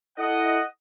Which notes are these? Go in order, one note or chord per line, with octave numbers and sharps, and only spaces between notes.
E4 A4 D#5 F#5